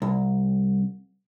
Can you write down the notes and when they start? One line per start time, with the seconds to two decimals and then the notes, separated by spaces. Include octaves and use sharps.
0.02 C2